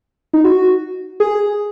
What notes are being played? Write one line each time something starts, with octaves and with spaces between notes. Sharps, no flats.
D#4
F#4
G#4